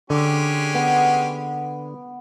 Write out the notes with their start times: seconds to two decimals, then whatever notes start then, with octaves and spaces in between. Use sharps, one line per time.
0.10 D3 G#3 C#4 G4
0.75 B3